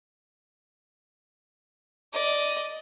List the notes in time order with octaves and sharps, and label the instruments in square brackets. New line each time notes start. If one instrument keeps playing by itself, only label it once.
[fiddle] D5 D#5